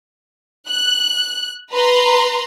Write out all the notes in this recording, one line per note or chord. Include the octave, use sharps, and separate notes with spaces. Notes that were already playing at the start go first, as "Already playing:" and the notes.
F#6
B4 A#5 C6